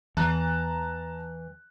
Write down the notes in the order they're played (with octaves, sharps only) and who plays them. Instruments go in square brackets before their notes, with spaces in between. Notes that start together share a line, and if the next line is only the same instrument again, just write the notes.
[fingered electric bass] E2 [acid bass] E3 [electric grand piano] A5 A#5 F#6